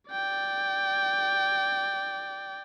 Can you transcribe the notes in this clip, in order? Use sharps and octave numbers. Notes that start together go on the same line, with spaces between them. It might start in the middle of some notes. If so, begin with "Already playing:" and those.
D5 G5